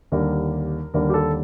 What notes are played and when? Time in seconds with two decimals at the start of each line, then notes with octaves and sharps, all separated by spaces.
0.12 D#2 D3 G3 A#4
0.94 D#2 D3 G3 A#4
1.10 G4
1.14 A4